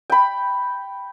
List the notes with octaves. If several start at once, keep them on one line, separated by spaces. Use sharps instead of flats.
G5 B5